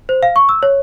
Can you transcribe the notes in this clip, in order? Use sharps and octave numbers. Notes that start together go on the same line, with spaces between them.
C5
F5
C#6
E6
C#5